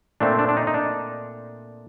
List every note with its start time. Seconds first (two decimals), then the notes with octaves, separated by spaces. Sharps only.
0.20 A#2 A3 C4 D4
0.39 D4
0.49 D4
0.57 D#4
0.67 D#4
0.74 D4